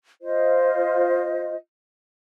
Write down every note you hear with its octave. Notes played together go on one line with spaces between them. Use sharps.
F4 C5 D#5